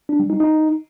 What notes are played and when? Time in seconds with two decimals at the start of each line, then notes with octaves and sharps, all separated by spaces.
0.09 D4
0.19 G3
0.30 D#4
0.40 D#4